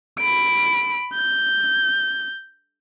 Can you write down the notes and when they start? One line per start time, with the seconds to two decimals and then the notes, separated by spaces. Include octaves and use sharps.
0.19 B5 D7
1.14 G6